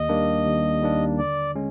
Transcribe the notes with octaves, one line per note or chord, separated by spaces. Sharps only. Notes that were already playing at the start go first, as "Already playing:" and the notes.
Already playing: D#2 D#5
D#3 G3 A#3 D4
D#2
D#3 G3 A#3 D4
D3 D5
G#3 C#4